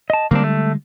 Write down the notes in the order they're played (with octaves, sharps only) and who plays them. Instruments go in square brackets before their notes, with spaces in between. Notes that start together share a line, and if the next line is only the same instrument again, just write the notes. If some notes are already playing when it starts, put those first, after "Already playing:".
[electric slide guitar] D#5 A5
[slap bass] D3 G3 G#3 [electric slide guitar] A#3 C4 D4
[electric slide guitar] A3